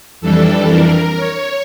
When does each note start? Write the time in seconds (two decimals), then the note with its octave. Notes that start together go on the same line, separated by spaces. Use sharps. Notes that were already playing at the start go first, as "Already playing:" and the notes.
0.21 F2 E3 G3 D4 A4
0.69 A#4
1.16 C#5